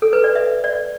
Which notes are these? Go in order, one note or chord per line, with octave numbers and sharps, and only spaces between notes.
A4
B4
D5
E5
D5